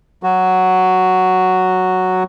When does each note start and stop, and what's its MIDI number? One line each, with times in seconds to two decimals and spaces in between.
0.23 2.23 54
0.23 2.23 66